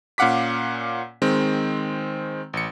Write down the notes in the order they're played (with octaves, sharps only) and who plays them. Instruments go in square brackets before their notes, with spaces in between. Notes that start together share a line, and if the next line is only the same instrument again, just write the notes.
[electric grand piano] A#2 C#4 F5 F#5 D6 B6
D#3 G#3 C4
A1 C#7